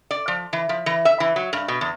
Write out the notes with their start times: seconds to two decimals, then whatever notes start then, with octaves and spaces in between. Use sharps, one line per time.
0.11 D5
0.28 F3
0.53 E3
0.69 F3
0.86 E3
1.05 E5
1.20 E3
1.36 F#3
1.53 G2
1.68 B2
1.81 E2